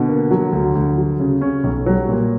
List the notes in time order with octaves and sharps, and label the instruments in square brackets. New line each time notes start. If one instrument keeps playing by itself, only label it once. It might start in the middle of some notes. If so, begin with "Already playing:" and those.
Already playing: [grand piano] B2 [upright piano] D3
[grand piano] A#3
F#3
D2
D2
F#3
C#3
C#4
B1
[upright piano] F#3 [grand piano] G3
[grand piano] A#2